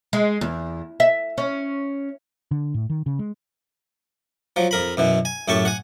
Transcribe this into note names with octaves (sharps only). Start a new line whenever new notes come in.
G#3
E2
E5
C#4
D3
A2
D#3
C#3
G#3
F3 F#3
F2 A#4 B5
F#2 B2 E3
G#5
F#2 A2 G4 A5 C#6
F#5 G#5